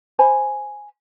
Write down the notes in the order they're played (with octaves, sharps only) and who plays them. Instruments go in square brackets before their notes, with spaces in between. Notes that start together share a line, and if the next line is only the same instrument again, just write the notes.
[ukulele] C5 G#5 B5